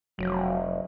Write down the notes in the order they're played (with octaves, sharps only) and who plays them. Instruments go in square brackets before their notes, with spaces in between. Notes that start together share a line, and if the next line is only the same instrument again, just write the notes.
[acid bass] F1 [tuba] F#3